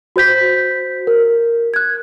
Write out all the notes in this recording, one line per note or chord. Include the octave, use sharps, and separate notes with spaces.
F#4 C5 G6 B6
A#4
F#6 G#6